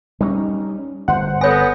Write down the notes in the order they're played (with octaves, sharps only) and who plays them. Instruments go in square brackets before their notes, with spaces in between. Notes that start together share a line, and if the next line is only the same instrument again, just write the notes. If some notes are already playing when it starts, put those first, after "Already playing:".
[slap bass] G3 A#3 C#4 [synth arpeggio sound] D#4
[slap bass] G1 [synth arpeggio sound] C5 F#5
[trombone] B3 [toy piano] A4 C#5 G#5 [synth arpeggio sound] A#6 C#7